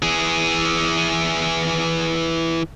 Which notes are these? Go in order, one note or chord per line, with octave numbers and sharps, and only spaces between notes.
E3 G#4